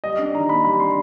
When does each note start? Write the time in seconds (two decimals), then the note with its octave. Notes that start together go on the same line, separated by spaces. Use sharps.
0.04 G3 D#5
0.19 D4
0.35 D#3 A#5
0.49 A#3 B5
0.65 G3 B5
0.79 D4 C6